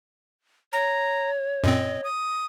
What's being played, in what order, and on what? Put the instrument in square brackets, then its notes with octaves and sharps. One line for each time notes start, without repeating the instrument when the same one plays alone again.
[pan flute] C#5 [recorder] A#5
[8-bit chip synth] F#2 A#2 C4 [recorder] D#5
[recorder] D#6